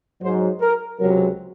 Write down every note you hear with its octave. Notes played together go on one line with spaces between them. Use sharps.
G#2 F#3 C5
A#4
C#2 C3 F#3 A#4